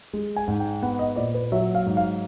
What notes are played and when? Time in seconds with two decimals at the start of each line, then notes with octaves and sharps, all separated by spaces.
0.13 G#3
0.36 G#5
0.48 G#2
0.60 G5
0.82 B3 F#5
0.99 D#5
1.16 A#2 D5
1.34 B4
1.52 F#3 E5
1.75 F5
1.86 G#2
1.97 F5